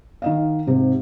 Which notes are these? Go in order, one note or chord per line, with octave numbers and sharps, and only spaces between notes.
D#3 D#5 F5
G#2 C3